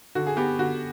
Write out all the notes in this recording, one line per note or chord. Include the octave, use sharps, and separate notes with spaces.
D3 F#4
G#4
B3 G4
D3 F#4